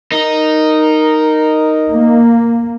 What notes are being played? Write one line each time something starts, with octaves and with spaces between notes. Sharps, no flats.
D#4 A#4
A#3